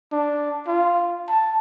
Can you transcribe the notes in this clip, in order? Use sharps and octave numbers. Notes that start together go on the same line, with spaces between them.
D4
F4
A5